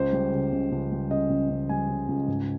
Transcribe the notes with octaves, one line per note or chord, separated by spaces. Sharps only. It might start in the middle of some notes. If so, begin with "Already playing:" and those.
Already playing: C#2 C5
G3
C#3
C#2
C#2
G3
C#3 D#5
C#2
C#2
G3 G#5
C#3
C#2
G#2